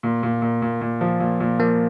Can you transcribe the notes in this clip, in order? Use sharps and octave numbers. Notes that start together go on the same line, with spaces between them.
A#2
A#2
A#2
A#2
A#2
F3
A#2
A#2
F3 A#3